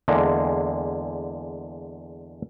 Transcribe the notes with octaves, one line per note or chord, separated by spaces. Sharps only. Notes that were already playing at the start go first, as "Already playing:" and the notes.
E2 D3 G#3 A#3